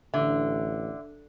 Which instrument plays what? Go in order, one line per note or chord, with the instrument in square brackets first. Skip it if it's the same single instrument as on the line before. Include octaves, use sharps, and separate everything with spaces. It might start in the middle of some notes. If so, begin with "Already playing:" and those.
[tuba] A1 [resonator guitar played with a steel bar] D3 [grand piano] E5